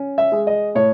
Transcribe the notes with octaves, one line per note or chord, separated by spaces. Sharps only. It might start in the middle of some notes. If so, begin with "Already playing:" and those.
Already playing: C#4
E5
G#3
D#5
A2 C#5